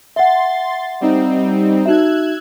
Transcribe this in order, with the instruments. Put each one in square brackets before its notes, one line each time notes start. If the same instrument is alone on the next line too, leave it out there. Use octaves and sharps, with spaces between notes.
[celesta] E5 F#5 [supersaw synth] C6 A6
[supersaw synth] G3 C4 D#4
[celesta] D#4 F#4 E5 [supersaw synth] E6 F#6 G#6